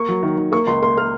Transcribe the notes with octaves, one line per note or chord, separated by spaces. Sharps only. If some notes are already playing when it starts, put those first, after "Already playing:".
Already playing: A#3 C#6
F#3
D#3
D#3
A#3 C#6
C#2 C6
A#3 C6
A#3 F6